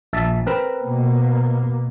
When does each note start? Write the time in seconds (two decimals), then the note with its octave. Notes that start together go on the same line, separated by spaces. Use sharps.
0.13 A#1 E5 A5
0.46 C4 A#4 B4
0.81 B2 A#3 B3